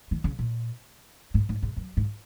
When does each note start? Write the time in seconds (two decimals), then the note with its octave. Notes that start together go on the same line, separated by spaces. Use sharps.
0.11 D#3
0.24 C#3
0.39 A#2
1.34 G#2
1.49 G#2
1.63 G#2
1.76 F#2
1.97 G#2